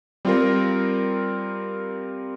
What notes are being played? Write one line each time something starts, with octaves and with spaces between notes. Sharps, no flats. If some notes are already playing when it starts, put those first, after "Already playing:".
G3 C4 F4 A#4